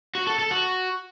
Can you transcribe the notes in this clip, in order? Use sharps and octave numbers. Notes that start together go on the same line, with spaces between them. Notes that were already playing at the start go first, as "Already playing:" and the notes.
F#4
A4
A4
F#4